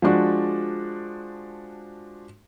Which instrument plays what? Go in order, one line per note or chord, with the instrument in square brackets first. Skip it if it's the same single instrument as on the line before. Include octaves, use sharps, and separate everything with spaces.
[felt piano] F3 G#3 D4 F#4